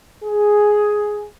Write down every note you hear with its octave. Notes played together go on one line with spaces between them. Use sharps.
G#4